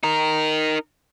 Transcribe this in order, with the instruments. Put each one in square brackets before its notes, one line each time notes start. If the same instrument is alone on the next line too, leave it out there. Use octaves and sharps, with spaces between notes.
[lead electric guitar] D#4 A#4